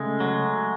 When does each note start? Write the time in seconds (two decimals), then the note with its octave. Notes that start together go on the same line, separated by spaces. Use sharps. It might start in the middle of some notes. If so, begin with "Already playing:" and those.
Already playing: C#3 G#3 A3
0.20 F#3